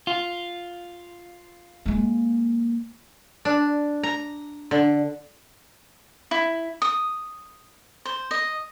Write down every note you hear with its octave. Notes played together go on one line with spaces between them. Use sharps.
F4
G#3 A#3
D4
A#5
D3
E4
D#6
C5
D#5